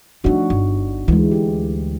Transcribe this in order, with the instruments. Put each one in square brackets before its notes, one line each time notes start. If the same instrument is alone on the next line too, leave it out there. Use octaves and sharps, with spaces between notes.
[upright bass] F3 A3 [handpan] D4 D#4 F#4
[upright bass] G1
[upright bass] D2 E4 [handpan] E3 G#3
[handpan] G4